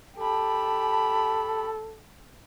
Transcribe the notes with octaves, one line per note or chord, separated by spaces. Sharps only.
G4 A4 A5 B5